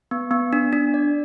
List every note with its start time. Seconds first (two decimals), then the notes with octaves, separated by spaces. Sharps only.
0.11 B3
0.31 B3
0.53 D4
0.73 D4
0.94 D5